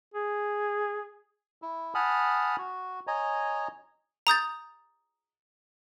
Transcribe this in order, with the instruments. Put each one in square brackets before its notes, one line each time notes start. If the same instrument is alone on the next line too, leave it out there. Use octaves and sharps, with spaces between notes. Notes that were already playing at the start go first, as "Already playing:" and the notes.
[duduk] G#4
[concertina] E4
F#5 G#5 A5 B5 D#6 F6
F#4
C#5 D#5 G#5 A#5
[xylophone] A#5 D#6 G6 A6